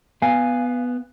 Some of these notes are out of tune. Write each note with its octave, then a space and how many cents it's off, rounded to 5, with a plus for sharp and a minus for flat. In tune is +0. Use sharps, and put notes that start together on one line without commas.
B3 +0 F5 +0 G#5 -10